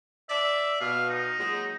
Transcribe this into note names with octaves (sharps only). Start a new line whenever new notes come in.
D5 E5
B2 F5
D#4
A#2 F#3 G#3